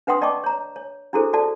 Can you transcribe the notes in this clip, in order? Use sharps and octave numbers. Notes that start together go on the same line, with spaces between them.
D4 B4 F#5 G5 C6 D#6
D5 D#5 G5 A5 C#6 D6
C#5 A#5
C#5
D4 E4 F#4 G#4 A4 C5
F#4 A4 D5 A5